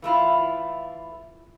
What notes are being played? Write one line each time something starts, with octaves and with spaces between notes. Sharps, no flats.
E3 A3 E4 F4